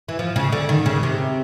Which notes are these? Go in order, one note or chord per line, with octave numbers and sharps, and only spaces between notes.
E3
F3
C#3
D3
D#3
C#3
C3